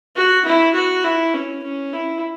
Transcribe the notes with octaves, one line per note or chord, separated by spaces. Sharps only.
F#4
E4
F#4
E4
C#4
C#4
E4